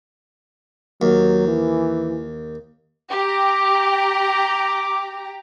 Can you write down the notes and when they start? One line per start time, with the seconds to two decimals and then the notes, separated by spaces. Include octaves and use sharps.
1.02 D#2 F#3
1.48 E3
3.11 G4 A#5 D6